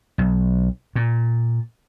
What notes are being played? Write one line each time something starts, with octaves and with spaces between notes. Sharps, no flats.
B1
A#2